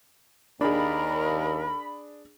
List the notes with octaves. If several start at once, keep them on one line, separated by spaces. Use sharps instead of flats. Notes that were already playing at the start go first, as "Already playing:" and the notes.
D#2 D4 G#4 A#4 B5